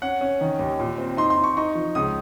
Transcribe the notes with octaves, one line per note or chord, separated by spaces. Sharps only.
C#4 F#5
C#4
D#3
D#2
A#2
C4
D#4 C6
C6
D#4
C#6
D#4 C#6
F3
C#2 D#6